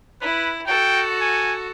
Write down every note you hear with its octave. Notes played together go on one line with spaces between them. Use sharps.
E4 B4
F#4 A4 G5
G#5